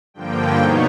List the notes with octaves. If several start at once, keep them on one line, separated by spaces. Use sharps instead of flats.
G2 D3 F3 A#3 G5
B2 F#3 B3 D#4 C#5